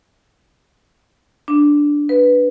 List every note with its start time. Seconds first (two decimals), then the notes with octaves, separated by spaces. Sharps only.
1.48 D4
2.09 B4